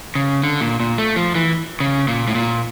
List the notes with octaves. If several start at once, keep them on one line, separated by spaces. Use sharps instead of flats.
C#3
D3
A#2
A#2
A3
F3
E3
C#3
A#2
A2
A#2